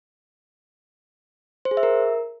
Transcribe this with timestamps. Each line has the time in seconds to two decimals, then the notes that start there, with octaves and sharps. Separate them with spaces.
1.65 C5
1.71 G#4
1.77 E5
1.83 A#4